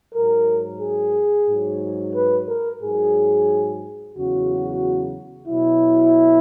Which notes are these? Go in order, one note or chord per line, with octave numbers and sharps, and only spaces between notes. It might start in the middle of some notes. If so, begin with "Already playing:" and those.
G#2 F#3 A#4
G#4
G#2 F#3
B4
A#4
G#2 F#3 G#4
E2 C#3 F#3 F#4
B2 F#3 E4